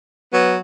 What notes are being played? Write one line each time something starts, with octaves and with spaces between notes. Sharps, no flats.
F#3 B3